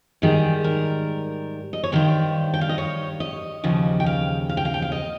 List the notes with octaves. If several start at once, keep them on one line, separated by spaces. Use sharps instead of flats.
G#2 D#3 G3 G#4
A#4
D#5
C#5
G2 D#3 G3 C5
G5
F5
D#5
C#5
D#5
D#2 C#3 F3
G5
F5
F5
G5
F5
G5
F5
D#5